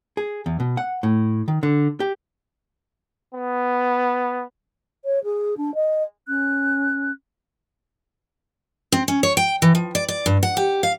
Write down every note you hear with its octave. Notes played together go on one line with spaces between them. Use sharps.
G#4
E2
B2
F#5
A2
D#3
D3
G4
B3
C#5
G#4
D4
D#5
C#4 F#6
C4
C#4
C#5
G5
E3
F3
D5
D5
G2
F#5
G4
F5